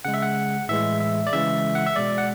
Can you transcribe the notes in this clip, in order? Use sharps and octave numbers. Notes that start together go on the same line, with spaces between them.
C#3 G#3 F#5
E5
F#5
A2 E3 G#3 E5
E5
D5
C#3 E3 G#3 E5
F#5
E5
B2 G#3 D5
F#5